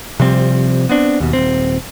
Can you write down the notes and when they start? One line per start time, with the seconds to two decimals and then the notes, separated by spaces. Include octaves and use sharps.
0.20 C3 F3 G3 C4
0.89 B3 C4 D4
1.20 D#2 B2
1.33 D#1 G#1 C4